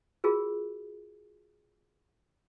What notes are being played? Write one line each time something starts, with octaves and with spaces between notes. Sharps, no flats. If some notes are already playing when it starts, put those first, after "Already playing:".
F4 F#4 G#4 A#4